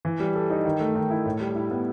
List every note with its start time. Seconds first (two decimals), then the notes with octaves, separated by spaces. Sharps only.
0.05 E3
0.20 G3
0.35 A4
0.50 D#4
0.65 D#3
0.80 A3
0.95 D#3
1.10 E4
1.25 A2
1.40 G3
1.55 E4
1.71 B3